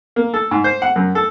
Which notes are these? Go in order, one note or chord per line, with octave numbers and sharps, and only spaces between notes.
A#3
A4
G#2
C5
F#5
F#2
A4